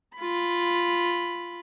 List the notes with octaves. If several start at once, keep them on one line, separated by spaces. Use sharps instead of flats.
F4 B5